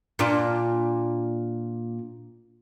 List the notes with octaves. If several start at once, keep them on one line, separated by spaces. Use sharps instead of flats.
A#2 D4 F4